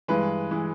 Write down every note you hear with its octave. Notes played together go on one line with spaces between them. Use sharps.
G2 E3 G#3 B4
E3 G#3